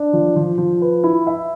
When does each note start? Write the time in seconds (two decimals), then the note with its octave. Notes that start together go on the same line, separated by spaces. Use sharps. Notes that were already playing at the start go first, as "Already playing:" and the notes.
Already playing: D4
0.13 F3
0.36 F3
0.58 F3
0.82 B4
1.04 E4
1.27 E5